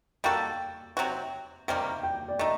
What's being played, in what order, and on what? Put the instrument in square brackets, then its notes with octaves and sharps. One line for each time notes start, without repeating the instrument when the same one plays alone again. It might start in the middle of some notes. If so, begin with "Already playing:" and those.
[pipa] G3 A#3 F#4 A4 [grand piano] G5
[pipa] C3 F#3 C4 F#4
[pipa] C3 D#3 G3 A#3 [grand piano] G5
[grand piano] G5
D5
[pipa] A3 D#4 [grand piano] D#5